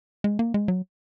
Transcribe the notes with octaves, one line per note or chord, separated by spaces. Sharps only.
G#3
A#3
G#3
F#3